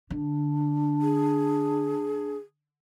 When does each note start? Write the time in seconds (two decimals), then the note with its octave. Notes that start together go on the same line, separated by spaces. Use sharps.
0.10 D3 D4
1.02 G#4